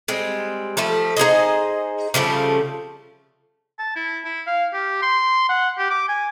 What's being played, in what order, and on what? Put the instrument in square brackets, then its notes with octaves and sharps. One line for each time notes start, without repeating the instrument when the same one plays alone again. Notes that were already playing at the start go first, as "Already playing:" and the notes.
[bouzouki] G3 G#3 C4
F3 G3 A3 A4
D#4 G#4 C5 D#5
C#3 F3 G3 A3
[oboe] A5
E4
E4
F5
G4
C6
F#5
G4
D6
G#5